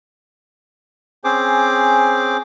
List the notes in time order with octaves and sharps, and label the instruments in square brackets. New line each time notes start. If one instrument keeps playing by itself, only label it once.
[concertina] C4 C#4 G#4 C5 D6